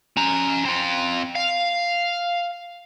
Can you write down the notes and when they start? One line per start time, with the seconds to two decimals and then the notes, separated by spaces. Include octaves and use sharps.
0.17 C#4 A#5
0.65 C4 F4
1.36 F5